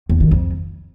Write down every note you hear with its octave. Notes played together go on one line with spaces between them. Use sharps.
E2
D#3
F2